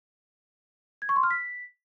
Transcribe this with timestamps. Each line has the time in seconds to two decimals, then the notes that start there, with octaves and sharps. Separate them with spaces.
1.02 G#6
1.09 C#6
1.16 C6
1.23 F6
1.31 B6